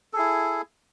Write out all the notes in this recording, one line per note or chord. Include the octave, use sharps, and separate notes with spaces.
E4 G#4 A4